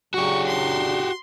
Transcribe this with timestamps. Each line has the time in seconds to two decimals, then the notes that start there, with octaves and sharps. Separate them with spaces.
0.14 C#3 F#3 D4 F#4 G4 C#6
0.47 C6